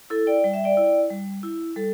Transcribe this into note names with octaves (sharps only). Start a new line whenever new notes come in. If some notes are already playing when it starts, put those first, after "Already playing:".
E4 A4
D5 G5
G3 G5
E5
D5 G5
E4
G3
E4
G3 A4